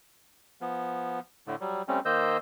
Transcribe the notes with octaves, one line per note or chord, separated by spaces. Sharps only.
F3 B3
A2 D3 A3
F#3 G3
G3 A3 C4 C#4
D#3 A#3 C5 D#5 E6 G6